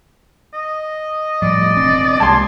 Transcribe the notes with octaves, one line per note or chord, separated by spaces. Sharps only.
D#5
A2 F3 G3 D5
E1 C4 D4
C2 G#3 A#3 G#5 A5 C6